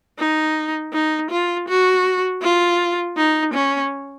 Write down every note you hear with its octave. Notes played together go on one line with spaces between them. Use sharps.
D#4
D#4
F4
F#4
F4
D#4
C#4